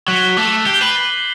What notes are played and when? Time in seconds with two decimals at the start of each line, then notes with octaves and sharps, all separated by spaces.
0.08 F#3 F#6 B6 E7 G7
0.37 A3 D6 A6 E7
0.67 G4 G6 C7 G7
0.81 B4
0.96 A6 C7 F#7